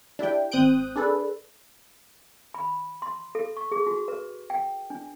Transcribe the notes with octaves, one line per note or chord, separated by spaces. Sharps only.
D4 E4 G4 G5
G#1 C4 D#6 F#6 G6 D7
D4 G#4 A4 B4
B5
C6
A4
C#6
G#4
F#4
B4
G5
D4